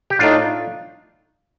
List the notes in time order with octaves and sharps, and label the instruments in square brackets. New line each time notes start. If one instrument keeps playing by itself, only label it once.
[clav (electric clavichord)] G4
[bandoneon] A2 A3 D#4 [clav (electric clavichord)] D4 F4